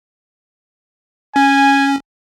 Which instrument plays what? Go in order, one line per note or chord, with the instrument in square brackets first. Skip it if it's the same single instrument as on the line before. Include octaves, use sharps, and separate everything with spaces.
[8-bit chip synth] C#4 [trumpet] G#5